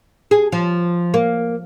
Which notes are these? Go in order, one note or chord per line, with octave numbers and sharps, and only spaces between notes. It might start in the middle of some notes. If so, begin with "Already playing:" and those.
G#4
F3
A#3